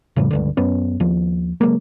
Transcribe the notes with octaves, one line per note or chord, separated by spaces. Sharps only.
F2 A2 C#3 G3
C#2 G2 D3
F#2 B3 C#4
D#2 F3
C#3 F#3 G#3 A#3